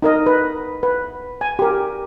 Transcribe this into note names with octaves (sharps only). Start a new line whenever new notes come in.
D#4 A#4 D#5
B4
B4
G#5
G4 A#4